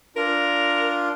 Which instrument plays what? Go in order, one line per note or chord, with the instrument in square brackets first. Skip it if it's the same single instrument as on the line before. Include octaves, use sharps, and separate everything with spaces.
[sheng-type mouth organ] D4 F4 [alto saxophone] A#4